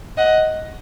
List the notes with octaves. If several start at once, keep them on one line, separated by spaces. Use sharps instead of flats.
D#5 F#5